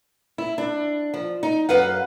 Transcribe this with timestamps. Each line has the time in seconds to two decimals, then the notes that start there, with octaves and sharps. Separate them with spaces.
0.38 E4
0.58 D4
1.14 F3
1.43 D#4
1.69 F#2 B4 F5 F#5